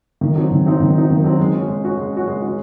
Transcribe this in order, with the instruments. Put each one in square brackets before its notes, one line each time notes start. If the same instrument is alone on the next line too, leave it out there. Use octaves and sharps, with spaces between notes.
[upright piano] D#3
F#3 C4 D#4
D#3
F#3 C4 D#4
D#3
F#3 C4 D#4
D#3
F#3 C4 D#4
G#3
C#4 F#4
G#3
C#4 F#4
G#3
C#4 F#4
G#3
C#4 F#4